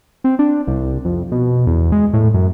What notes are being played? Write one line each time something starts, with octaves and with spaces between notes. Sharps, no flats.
C4
D4
C2
F2
B2
E2
G#3
A2
F#2